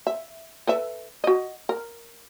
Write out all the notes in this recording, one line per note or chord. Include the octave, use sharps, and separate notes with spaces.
E5
A4 B4 E5
F#4 D#5
A#4